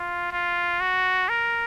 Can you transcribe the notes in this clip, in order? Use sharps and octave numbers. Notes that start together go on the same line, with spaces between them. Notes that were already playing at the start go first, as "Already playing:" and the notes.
Already playing: F4
F4
F#4
A#4